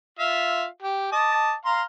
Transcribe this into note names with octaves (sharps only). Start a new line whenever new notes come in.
F4 E5 F5
G4
D#5 A5 D6
F5 A#5 C6